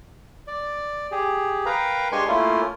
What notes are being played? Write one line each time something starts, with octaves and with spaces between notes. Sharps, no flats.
D5
G4 G#4
A#4 B4 F5 G5 A#5
G#3 D4 G4 G#5 C6 C#6
A3 A#3 C#4 E4 F4